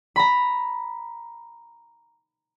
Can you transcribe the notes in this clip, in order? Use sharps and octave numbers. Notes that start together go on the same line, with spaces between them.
A#5 B5